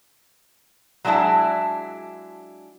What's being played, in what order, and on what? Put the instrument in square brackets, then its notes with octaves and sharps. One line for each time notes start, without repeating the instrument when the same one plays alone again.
[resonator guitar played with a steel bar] F#3 G#3 D4 E4 A5